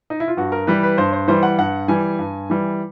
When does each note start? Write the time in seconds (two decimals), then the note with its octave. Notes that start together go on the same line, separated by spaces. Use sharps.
0.10 D#4
0.20 E4
0.28 F4
0.37 G2 F#4
0.52 A#4
0.67 E3 G3 B4
0.83 B4
0.98 G2 C5
1.13 C5
1.28 E3 G3 C5
1.43 F#5
1.58 G2 F#5
1.88 E3 G3 G#5
2.19 G2
2.50 E3 G3